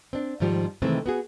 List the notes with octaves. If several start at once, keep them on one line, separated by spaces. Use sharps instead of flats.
C4 D4
G#2 D#3 F3 G3
C3 D#3 E3 G#3 A3 C4
B3 F#4 G#4